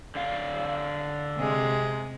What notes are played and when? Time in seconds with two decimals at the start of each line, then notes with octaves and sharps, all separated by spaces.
0.15 D3 D4 F5
1.37 C3 G#3